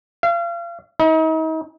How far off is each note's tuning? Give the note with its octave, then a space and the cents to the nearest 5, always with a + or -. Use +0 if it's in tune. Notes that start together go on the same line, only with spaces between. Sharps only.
F5 -35
D#4 +40